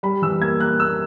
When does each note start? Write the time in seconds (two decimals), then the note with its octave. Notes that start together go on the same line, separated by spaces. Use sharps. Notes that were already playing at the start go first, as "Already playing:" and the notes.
0.03 G3 B5
0.22 E3 E6
0.41 A#3 G#6
0.60 A#3 F#6
0.79 A#3 E6